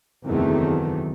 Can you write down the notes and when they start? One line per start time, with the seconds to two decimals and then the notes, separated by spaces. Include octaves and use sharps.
0.25 F#1 E2 C3 D#3 F#3 A3